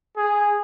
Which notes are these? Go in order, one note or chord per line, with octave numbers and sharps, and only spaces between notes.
G#4